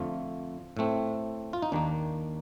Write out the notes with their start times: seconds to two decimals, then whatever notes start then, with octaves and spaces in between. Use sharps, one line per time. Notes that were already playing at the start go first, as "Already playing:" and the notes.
Already playing: F2 D3 A3 F4
0.77 A2 A3 C4
1.53 F4
1.62 D#4
1.72 D#2 D#3 A#3 D4